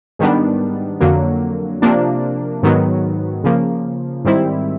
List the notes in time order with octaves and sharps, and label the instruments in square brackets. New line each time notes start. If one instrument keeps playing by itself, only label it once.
[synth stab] G#2 D#3 G3 B3 D4
F2 D3 F#3 A#3
C3 F3 A#3 D4
G#2 D#3 F#3 B3
C#3 F3 A#3
G#2 D#3 G3 C4 E4